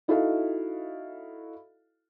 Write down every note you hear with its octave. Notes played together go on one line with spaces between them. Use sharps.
D#4 E4 F#4 A4 D#5 F5